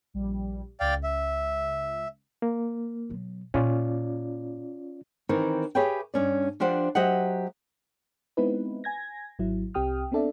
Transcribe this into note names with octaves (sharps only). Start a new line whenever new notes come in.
A#1 G3
C#2 D5 F5 G5
E5
A#3
B2 F#3
A#2 C#4 F4 D5
D#3 E3 C4 D#4 A#4
G4 G#4 B4 C#5 E5 G5
G2 C#4 D5
F3 D4 G4 C5 F#5
F#3 G4 C5 D#5 E5 F#5
G#3 B3 C4 D#4 E4 B4
G#5 G#6 A#6
G#1 F#3 E4
C2 C4 G4 G5 D#6 F6
B3 C4 D4 A4 D5 E5